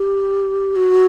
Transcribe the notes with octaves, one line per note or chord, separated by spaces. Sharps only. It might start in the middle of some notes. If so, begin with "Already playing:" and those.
Already playing: G4
F#4